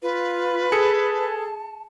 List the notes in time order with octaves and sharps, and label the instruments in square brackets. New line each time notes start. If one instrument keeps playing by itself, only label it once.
[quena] F4 [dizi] B4
[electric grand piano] G#4 A4 C#7 [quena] A5